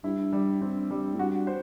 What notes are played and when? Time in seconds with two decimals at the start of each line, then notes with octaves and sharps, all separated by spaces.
0.04 G2 E4
0.33 G3
0.61 G2 C4
0.91 G3
1.14 A2
1.19 G2 F#4
1.47 C5